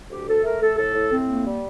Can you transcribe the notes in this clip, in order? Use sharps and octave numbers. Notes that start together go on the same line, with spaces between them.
D2 G4
D2 A4
A3 A#4
A3 A4
A2 A4
A2
A2 C4
A#3
G3